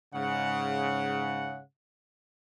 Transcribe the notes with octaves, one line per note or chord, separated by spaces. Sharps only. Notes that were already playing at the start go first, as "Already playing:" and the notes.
G#2 C#3 F#5